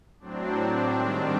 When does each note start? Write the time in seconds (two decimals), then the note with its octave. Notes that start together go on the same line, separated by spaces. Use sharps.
0.20 A2 F#3 C4 D4
0.92 G#2 D#3 G3 C4 D4